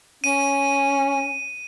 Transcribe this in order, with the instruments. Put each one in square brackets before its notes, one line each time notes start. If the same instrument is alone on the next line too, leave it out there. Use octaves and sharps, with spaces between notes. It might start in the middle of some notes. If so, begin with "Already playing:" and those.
[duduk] C#4 [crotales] D#7